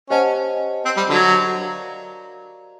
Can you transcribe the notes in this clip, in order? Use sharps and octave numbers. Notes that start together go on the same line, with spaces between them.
C#4 G4 C5 D#5 F#5 A5
C4
G3
D3 F#3
F#4 A#4 D5 F5 A#5